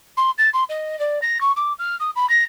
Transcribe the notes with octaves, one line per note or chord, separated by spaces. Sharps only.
C6
A6
C6
D#5
D5
A#6
C#6
D6
F6
D#6
B5
A#6